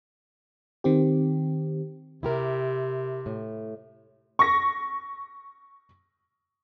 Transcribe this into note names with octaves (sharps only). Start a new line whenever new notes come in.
D#3 C4 G4
C3 E4 G4 A#4
A2
C#6 A#6